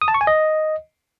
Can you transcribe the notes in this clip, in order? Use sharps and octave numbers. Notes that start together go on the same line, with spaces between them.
D#6
A5
C#6
G#5
D#5